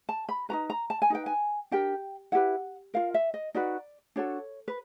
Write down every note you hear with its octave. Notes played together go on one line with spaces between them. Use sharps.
A5
B5
D#4 F#4 B4 A#5
A#5
A5
G#5
D#4 G#4 B4 G5
G#5
D4 G4 A#4 G5
E4 G4 B4 F#5
F4 A#4 F5
E5
D#5
D#4 F#4 B4 D5
D4 F#4 A4 C#5
B4